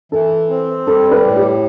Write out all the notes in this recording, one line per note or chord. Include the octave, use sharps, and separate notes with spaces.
E3 A4
C4
G3 A4
B4
A2
G4